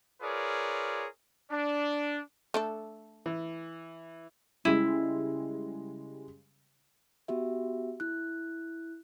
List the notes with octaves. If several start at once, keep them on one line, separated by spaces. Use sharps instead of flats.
F4 G#4 A#4 B4 C#5 D5
D4
A3 D4 A4
E3
C#3 G3 G#3 E4
B3 F#4 G4 E5
E4 F#6